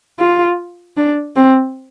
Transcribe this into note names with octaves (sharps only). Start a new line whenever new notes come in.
F4
D4
C4